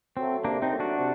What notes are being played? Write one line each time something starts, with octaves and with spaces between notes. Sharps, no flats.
F#3 A3 C4
C3 A#3 D4
C4 D#4
F#3 A3
D4 F#4
C3